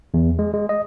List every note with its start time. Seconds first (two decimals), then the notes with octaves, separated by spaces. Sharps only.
0.14 E2
0.39 G#3
0.54 G#3
0.69 D#5